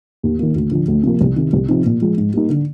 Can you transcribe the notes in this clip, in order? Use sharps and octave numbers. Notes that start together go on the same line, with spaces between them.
D#2
D#3 A#3
D2
D3 F3
D2
C3 F3 A#3
C2
C3 D#3
C2
C3 F3 C4 D#4
A#2
F3 G#3
G#2
G3 A#3 D#4
D3